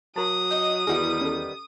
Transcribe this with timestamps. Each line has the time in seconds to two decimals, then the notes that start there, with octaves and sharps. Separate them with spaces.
0.16 F#3 A#4 A5 D#6
0.51 D#4 D#5
0.87 E2 D#3 G3 B3 E4 F#4 G#4
1.21 C#4 A4